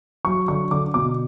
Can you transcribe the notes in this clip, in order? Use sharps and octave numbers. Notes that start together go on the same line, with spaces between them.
F#3 C#6
D3 C#6
D3 D6
B2 D6